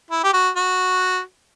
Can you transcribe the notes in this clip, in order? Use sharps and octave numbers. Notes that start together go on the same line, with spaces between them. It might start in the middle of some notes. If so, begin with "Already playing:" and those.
E4
G4
F#4
F#4